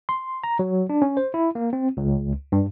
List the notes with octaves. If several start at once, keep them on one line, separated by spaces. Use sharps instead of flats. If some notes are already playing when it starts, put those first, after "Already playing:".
C6
A#5
F#3
D4
C#4
C5
E4
A#3
C4
C#2
G2